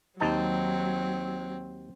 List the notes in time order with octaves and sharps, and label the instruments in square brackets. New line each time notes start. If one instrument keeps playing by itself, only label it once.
[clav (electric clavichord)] D#2 D#4 A5 [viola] F#3 [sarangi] C4